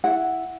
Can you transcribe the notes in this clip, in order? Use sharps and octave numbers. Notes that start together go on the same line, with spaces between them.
E4 F#5